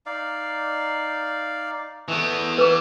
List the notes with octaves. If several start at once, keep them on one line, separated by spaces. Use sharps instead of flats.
D#4 D5 F5
E3 A3 B3 E4 D#5
B4 D6